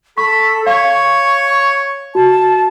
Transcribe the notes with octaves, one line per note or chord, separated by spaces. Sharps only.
A4 B5 C#6
C#5 F5 C#6
F#4 A5